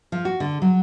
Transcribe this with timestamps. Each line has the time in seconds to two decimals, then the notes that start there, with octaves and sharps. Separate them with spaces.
0.12 F3
0.25 F#4
0.40 D3
0.62 F#3